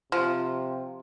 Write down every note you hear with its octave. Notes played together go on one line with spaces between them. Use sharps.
C3 F3